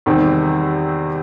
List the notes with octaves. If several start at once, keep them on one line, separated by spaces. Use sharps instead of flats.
E2 C3 D#3 G3 C4